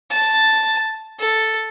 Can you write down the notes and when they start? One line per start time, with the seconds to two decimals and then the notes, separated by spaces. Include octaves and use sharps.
0.11 A5
1.20 A4